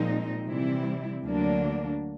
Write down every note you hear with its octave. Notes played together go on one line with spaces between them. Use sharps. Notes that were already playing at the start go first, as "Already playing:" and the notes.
Already playing: A#2 F3 G#3 C4 D#4
C3 E3 G3 C4 E4
D2 D3 F#3 A#3 D4